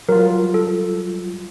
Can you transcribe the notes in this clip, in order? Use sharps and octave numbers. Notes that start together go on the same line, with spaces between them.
F#3 G3 F4 A#4
A4